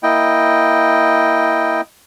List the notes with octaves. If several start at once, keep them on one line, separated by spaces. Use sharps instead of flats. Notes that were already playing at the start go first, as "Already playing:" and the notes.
A#3 E4 D#5 G5